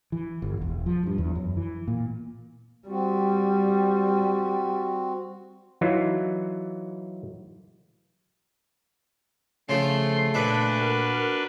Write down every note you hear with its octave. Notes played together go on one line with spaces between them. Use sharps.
E3
G1
E1
F3
G2
E2
F#2
E3
A#2
G3 C4 F#4
E3 F#3 D#4 F4
C#3 F3 A3 C6
A#2 D4 B4 E5
F#4 A#4